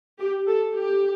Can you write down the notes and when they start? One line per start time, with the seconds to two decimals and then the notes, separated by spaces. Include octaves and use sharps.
0.18 G4
0.47 A4
0.76 G4